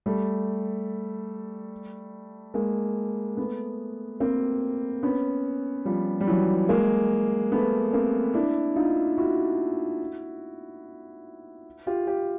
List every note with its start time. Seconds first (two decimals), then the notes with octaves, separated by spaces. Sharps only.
0.06 G3 A3
2.54 G#3 A#3
3.37 A3 B3
4.20 A#3 C4
5.03 B3 C#4
5.85 F3 G3
6.20 G3
6.27 E3 F#3
6.69 G#3 A#3
7.52 A3 B3
7.93 A#3 C4
8.34 D4 E4
8.76 D#4 F4
9.18 E4 F#4
11.87 F4 G4
12.07 F4 G4